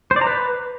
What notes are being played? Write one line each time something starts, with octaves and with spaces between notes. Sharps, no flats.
C5
D5
A#5
B4